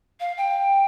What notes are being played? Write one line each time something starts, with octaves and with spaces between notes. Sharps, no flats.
F5
G5